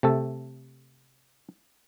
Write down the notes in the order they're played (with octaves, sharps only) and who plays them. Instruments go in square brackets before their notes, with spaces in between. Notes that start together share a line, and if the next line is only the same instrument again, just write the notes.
[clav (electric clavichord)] C3 A3 A4